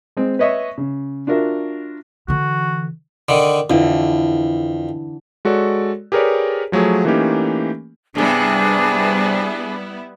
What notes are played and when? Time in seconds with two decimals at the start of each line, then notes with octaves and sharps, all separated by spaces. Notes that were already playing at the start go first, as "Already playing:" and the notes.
0.17 G#3 C4
0.39 B4 C#5 D#5 E5 C#6
0.78 C#3
1.27 D4 F4 F#4 A#4 E5
2.28 D3 E3 F#4
3.29 D3 D#3
3.70 F2 D3 E3
5.45 G#3 F#4 A4 C#5 D5
6.12 G4 G#4 A#4 B4 C#5 D5
6.72 F3 F#3 A3 G#4
7.05 E3 A3 A#3 C#4 D#4 G4
8.15 G2 C3 G3 B3 D4 E4 G#4